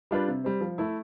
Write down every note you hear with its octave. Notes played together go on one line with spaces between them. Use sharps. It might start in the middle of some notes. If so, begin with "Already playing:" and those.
G3 D4 F4 B4
C3
G3 C4
F3
A3 E4